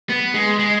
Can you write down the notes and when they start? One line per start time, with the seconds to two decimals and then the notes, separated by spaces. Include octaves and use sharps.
0.10 B3
0.34 G#3
0.59 G#3